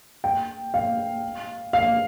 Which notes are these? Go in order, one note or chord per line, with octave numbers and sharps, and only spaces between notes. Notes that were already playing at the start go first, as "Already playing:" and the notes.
G5
F5
F5